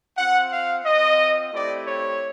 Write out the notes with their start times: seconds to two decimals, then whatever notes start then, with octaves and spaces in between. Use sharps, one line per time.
0.17 C4 F4 F#5
0.51 F5
0.85 C4 F4 D#5
1.53 A3 C4 E4 G4 D5
1.87 C#5